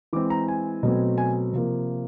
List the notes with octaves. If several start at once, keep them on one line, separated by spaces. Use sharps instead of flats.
E3 G#3 C4 D6
A#5
G#5
B2 F#3 A3 C4
G#5
C3 F3 A#3